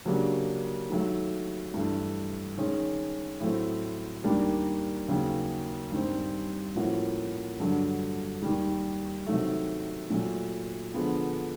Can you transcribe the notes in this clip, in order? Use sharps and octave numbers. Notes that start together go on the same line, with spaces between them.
C#3 F#3 A#3 D4 G4
D#3 F#3 A3
G2 E3 A3
D#3 G#3 C#4
A2 F#3 A3 C4
D#2 D#3 G3 A#3 D4
D#2 C#3 F#3 A#3
G2 D#3 G3 C4
A2 F3 A#3 C#4 F#4
G2 D3 F#3
D#2 D#3 G3
C3 D#3 F#3 A3
A#2 F#3 A3
D3 F3 G#3 B3